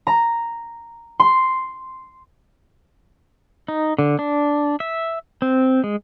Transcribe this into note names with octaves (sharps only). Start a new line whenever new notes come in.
A#5
C6
D#4
D3
D4
E5
C4
G#3